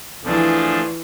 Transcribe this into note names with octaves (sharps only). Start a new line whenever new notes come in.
E3 F3 A3 D4 F4 G#4